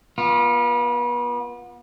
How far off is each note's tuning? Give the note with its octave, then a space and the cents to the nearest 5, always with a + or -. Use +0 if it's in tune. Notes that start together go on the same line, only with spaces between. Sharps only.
B3 -35 F4 +0